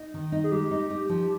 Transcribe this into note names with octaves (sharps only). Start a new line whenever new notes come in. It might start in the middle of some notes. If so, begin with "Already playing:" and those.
Already playing: D#4
D#3
D#4
G#4
G#3 G4
D#4
D#4
F3